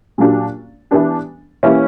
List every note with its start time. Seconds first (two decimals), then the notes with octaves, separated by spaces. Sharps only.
0.18 A#2 F#3 A#3 D4 G4
0.91 E3 B3 D4 G4
1.63 E3 A#3 C#4 E4 G4